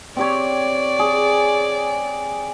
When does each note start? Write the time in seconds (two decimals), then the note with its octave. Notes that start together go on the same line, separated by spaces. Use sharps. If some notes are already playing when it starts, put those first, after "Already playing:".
0.17 C4 G4 C#5 D5
0.99 G#4